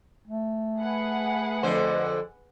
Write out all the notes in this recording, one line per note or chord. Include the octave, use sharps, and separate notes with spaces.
A3
G#4 B4 F#5
F2 D3 C5